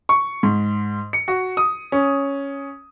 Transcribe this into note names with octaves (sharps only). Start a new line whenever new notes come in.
C#6
G#2
C#7
F#4
D#6
C#4